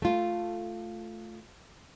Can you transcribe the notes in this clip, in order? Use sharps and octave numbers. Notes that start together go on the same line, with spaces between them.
A3 F4